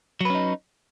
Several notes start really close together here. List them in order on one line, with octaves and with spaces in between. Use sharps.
F#3 B4 C#4 D#4